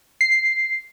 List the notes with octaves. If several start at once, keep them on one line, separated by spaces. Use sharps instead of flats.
C7